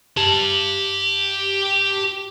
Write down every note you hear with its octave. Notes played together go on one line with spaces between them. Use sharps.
G4 A5